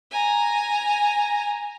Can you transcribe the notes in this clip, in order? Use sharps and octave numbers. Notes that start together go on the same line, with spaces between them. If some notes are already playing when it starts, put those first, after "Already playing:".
G#5 A#5